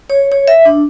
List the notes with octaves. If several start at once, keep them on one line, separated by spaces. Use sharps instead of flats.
C#5
C#5
E5
D4